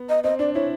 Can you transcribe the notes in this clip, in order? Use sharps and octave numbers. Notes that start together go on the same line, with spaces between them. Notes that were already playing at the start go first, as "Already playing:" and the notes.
Already playing: B3
D#5
C4 D#5
D4 D5
E4 C#5